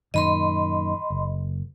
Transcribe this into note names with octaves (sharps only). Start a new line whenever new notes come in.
F#2 A#2 D#3 D#5 B5 C6
F#1